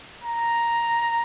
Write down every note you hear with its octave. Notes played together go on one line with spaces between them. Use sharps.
A#5